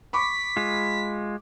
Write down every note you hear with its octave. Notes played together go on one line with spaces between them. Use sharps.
B5 C#6 D6 B6
G#3 F4